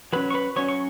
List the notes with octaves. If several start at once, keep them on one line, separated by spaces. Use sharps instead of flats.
F#3 C#4 B4 B5
C#6
B4 B5
F#3 C#4 C#5 C#6
C#6